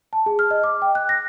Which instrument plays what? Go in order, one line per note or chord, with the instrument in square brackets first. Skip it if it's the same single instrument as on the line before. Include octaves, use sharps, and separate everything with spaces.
[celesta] A5
G#4
F6
D#5
D6
G5
F#6
A#6